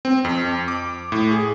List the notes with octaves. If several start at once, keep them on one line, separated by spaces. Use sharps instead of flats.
C4
F2
D6
A2
G#4